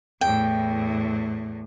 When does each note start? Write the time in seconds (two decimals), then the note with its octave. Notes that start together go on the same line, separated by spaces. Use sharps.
0.21 E2 A2 G5